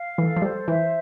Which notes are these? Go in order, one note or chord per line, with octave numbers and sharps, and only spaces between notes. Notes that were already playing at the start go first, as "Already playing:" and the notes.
Already playing: F5
E3 A4
F3
G3 C5
E3 E5